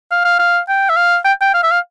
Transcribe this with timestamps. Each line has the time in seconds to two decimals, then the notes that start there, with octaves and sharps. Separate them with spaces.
0.11 F5
0.25 F5
0.39 F5
0.68 G5
0.89 E5
0.96 F5
1.25 G5
1.41 G5
1.54 F5
1.63 E5
1.71 F5